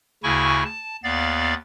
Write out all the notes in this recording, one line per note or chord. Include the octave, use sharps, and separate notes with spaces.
D2 C#3 E4 G#5 C#6
A5
D#2 B3 D5 F5 A6